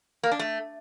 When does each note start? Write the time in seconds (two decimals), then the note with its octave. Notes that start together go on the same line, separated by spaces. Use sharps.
0.23 A#3
0.31 D4
0.39 A3